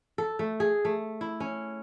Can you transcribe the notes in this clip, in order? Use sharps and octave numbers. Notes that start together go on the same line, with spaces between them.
A4
A3
G#4
A3
E4
C#4